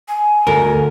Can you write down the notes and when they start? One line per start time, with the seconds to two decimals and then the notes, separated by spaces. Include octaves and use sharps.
0.08 G#5
0.47 D2 A#4